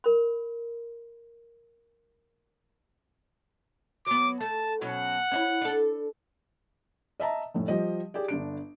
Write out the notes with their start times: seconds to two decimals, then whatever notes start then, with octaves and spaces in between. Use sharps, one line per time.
0.04 A#4 B5
4.06 F#3 B3 D6
4.40 A3 A5
4.81 B2 F#3 C#4 F#5
5.31 C#4 D4 E4
5.61 D4 A4
7.20 D#5 E5 A5 A#5
7.54 F1 A2
7.68 F3 G3 D#5
8.14 G4 G#4 D5
8.28 G1 D4 D7